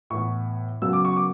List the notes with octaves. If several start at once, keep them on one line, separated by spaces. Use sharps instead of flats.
A2 E3 B3 C#6
F#2 C#3 F#3 B3 E6
D6
C#6
D6